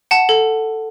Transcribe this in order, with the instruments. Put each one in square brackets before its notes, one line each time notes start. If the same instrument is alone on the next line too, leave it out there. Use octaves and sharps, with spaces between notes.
[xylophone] F#5 A5
A4